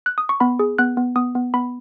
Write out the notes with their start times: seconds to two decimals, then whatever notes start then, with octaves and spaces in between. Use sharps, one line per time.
0.06 F#6
0.18 D#6
0.29 C#6
0.40 B3 B5
0.59 G#4
0.78 B3 F#6
0.97 B3
1.16 B3 D#6
1.35 B3
1.54 B3 B5